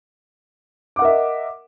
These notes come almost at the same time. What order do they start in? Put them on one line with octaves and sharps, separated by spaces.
D6 F#5 A#4 E5 D#5